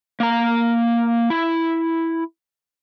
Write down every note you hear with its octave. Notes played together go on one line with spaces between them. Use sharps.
A#3 A#5
E4